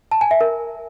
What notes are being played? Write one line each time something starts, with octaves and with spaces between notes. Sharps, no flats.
A5
G#5
E5
A#4